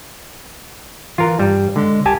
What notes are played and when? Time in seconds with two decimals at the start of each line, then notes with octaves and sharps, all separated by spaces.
1.18 E3 F4 A#4
1.39 G2 G3
1.76 D3 G#3
2.06 C2 G4 G#5 A5